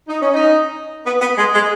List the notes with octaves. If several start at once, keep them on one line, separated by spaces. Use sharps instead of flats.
D#4
C#4
D#4
B3
B3
G#3
G#3